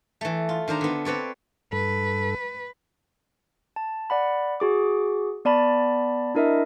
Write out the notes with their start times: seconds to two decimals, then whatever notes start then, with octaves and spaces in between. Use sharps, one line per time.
0.21 E3 A3
0.49 F4
0.68 D#3 D4 C5 A#5
0.81 D3 B3
1.05 C4 B4 C#5 D5
1.72 G2 A4 B4
3.76 A5
4.10 D5 F#5 B5
4.60 F#4 G#4 D6
5.45 B3 D5 A5 B5
6.35 D4 E4 A#4 D#5 E5